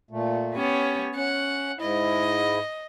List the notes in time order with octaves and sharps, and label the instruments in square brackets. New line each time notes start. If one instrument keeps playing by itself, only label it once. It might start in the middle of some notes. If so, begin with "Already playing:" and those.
[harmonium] A#2 A3
[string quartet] B3 C#4 C#5 [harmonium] G4
[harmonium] C#4 [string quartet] F#5
[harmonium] G#2 E4 [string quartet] D#5